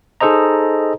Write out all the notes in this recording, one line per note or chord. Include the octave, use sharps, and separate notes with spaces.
D#4 G#4 A4 C5 D#5 A#5